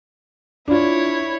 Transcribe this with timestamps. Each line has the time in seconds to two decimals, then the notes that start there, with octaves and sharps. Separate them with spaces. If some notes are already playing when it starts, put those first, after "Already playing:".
0.68 D4 E4 F4 C#5